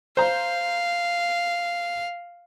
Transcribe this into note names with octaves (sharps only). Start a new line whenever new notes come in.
C5 F5 A#5